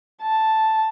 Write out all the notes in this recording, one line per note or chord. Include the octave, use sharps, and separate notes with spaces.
A5